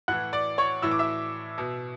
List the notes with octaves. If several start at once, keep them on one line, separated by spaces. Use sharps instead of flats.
A2 E3 F#5 F#6
D5 D6
C#5 C#6
A2 E3 E6
D6
E5 E6
B2